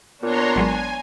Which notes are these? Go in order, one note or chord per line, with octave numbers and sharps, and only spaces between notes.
A#2 B3 D4 C#5 A#5 C6
G#1 F#3 G#3 G#5